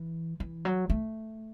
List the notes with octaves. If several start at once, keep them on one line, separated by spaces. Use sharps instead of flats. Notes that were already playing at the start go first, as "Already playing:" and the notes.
Already playing: E3
E3
F#3
A3